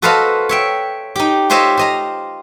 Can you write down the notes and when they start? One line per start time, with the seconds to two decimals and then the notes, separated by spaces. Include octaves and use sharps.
0.02 F#4 A4 B4 C5 D#5 F5
0.49 C#5 E5 G5
1.16 D#4 G4
1.50 F4 G4 C5 C#5 D#5 E5
1.77 C5 D#5 A#5